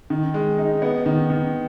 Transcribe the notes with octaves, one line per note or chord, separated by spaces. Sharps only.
D#3
G#3
D#4
B3
D#3
D#3